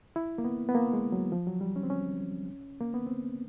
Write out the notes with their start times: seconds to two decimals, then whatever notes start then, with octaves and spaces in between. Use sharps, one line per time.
0.16 E4
0.38 A#3
0.44 B3
0.69 B3
0.75 A#3
0.93 G#3
1.12 F#3
1.32 F3
1.47 F#3
1.61 G3
1.76 C#4
1.83 C4
1.90 C#4
2.80 A#3
2.94 B3
3.06 C4